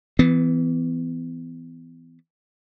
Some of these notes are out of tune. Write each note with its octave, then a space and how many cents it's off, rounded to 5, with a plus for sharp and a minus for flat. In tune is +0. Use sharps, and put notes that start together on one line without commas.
E3 +0 B3 +40